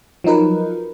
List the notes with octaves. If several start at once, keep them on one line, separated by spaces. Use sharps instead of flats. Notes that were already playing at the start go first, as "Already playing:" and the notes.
F3 F#3 D#4 A#4 B4